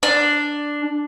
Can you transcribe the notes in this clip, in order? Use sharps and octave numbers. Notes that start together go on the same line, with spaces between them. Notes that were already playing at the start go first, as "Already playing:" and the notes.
D4